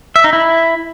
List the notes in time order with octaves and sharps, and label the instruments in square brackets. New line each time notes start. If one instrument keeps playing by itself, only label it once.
[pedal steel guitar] E5
D#4
E4